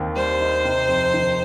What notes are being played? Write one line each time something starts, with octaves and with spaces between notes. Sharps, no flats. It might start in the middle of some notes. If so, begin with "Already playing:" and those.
Already playing: D#2 D#3 C4
G3 C5
D#4
C3
F2
D#3